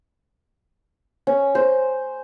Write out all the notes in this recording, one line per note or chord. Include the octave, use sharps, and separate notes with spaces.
C#4
C5